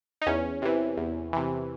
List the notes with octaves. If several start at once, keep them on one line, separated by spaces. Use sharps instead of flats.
D#4
E2 C#4
C3 E3
E2
C3 E3